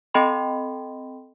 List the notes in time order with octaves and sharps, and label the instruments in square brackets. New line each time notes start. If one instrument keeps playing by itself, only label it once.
[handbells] C4 A4 D#5 G5 B5 C6